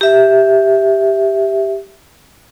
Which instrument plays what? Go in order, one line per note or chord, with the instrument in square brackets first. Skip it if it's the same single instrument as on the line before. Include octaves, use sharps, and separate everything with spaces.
[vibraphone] G4 E5